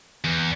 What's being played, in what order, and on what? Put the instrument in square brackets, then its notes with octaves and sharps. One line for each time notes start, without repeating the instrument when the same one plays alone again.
[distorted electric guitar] E2